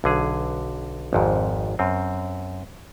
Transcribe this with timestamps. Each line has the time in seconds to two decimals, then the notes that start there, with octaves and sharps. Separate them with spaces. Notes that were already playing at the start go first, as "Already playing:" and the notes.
0.04 B1 D3 G#4
1.13 G#1 F2 G#2
1.79 F#2 C4